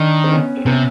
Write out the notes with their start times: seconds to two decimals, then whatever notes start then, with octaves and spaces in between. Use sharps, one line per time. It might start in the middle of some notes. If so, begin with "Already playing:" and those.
Already playing: D#3 D4
0.24 C4
0.32 B3 C#4
0.57 C4
0.66 C3 B3 C#4